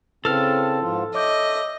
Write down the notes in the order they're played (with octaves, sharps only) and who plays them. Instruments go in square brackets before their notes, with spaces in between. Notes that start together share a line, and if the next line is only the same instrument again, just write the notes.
[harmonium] C#3 C4 [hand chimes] E4 B4 A5 [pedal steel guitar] A4 F6
[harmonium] G#2 F3 F4
[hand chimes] C#5 D6 G6 [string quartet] D#5 [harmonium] E5